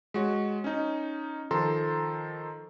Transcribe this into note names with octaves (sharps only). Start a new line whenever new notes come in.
G#3 F#4 C#5
C#4 D#4
D#3 F3 A4 A#5 C6